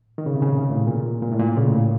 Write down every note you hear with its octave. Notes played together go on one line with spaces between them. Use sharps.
D#3
C#3
C3
C#3
A#2
A2
A#2
A#2
A2
A#2
C#3
A2
A#2